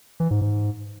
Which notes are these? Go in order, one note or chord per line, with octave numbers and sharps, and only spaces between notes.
E3
G#2
G#2